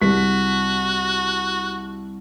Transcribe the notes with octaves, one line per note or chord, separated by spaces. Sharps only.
C2 F#4 B6